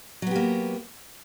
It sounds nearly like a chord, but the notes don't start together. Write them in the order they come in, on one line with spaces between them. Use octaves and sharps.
F#3 B3 G4 A#3